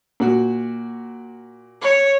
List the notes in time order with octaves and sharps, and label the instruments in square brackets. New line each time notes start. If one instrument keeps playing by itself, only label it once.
[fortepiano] A#2 F#4
[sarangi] C#5